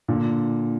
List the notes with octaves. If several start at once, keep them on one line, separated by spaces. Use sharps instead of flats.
A#2 D3